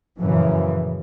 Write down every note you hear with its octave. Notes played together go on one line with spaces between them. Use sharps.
F#2 A#2 C#3 E3 F3